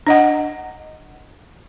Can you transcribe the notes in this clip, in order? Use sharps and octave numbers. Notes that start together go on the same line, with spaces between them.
D4 D#5 F#5